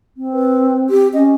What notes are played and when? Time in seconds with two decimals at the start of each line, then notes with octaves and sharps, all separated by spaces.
0.17 C4
0.33 B4
0.90 G4
1.14 C#4 D#5